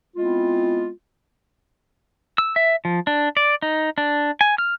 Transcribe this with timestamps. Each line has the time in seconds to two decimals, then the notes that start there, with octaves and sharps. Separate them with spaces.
0.16 G#3 B3 C4 E4 F4
2.38 E6
2.56 E5
2.85 F3
3.07 D4
3.37 D5
3.62 D#4
3.98 D4
4.41 G#5
4.58 F6